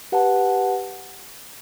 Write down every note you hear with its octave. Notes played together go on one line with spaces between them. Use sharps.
G4 B4 F#5 A5